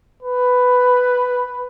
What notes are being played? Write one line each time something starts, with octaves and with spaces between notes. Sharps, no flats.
B4